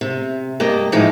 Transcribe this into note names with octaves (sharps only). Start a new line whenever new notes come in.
C3
G2 A#3 G4 D#5
A2 E3 F3 G#3 D#4